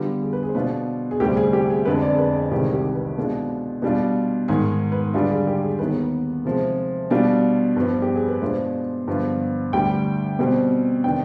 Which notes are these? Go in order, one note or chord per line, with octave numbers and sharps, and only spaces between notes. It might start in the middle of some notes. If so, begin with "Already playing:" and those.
Already playing: D3 G3 B3 F4 G4
G#4
B4
G#4
C5
B2 B3 D4 F4 B4
G#4
D2 C3 G3 C4 G4
G#4
G4
G#4
F2 D3 G#3 B4
D5
G#4
B4
G#4
C2 C3 D#3 G#3 G4
G4
B4
B2 G#3 D4 F4
B2 G3 D4 F4
G#2 D#3 G#3 G#4
B4
D3 G3 D4 F4 G#4
G#4
G4
G#4
D#2 D#3 B3 D#4 B4
C3 F3 G#3
B2 G3 D4 F4
G2 F3 B3
G4
G#4
B4
B2 G#3 D4 F4 C5
G2 D3 F3 B3 F4
D2 D3 G3 G5
B2 G3 C4
C3 D#3 B3 D4 G5